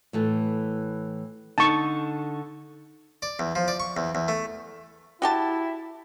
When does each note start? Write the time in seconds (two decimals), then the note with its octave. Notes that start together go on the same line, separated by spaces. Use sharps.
0.13 A2 E3 A4
1.58 D3 D#4 A5 C#6
3.22 D5
3.39 E2
3.55 F3
3.68 D5
3.80 C#6
3.97 E2
4.15 E2
4.28 A3
5.22 E4 F#4 G4 A5